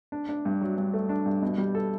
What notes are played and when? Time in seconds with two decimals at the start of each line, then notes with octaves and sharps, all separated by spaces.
0.12 D4
0.29 D4
0.45 G2
0.61 F#3
0.78 G2
0.94 A3
1.09 D4
1.26 G2
1.42 B2
1.58 G3
1.75 A4